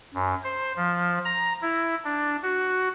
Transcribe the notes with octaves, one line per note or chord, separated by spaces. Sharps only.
F#2
C5
F3
A#5
E4
D4
F#4